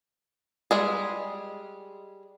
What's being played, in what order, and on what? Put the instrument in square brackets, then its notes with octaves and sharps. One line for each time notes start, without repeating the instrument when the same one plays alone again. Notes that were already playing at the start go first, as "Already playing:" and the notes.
[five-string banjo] G3 G#3 G#4